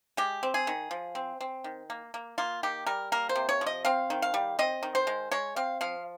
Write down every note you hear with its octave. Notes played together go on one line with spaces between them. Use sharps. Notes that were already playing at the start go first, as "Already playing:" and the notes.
G#3 G4
C4
G#4
D#3
F3
C4
C4
D#3
A#3
A#3
A#3 F4
D#3 G4
G3 A#4
A#3 A#4
C5
C3
C#5
F3
D#5
C4 F5
D#3
F5
G3
C4 D#5
D#3
C5
G#3
G#3 C#5
C4 F5
F3 F5